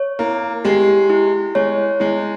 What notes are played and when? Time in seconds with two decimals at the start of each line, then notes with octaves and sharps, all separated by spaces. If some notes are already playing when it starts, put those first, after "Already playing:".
Already playing: C#5
0.19 A#3 E4
0.65 G#3 G4
1.10 E4
1.55 G#3 C#5
2.00 G#3 E4